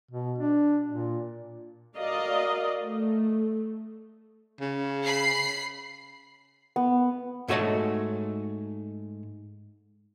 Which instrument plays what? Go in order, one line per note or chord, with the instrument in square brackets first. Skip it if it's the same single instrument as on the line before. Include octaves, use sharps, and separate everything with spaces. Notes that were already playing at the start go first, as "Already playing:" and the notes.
[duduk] B2
D4
A#2
[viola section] F#4 A#4 D5 D#5 F5
A3
[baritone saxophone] C#3
[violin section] B5 C7
[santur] B3
[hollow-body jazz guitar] G#2 A3 F#4 C#5 D#5 A5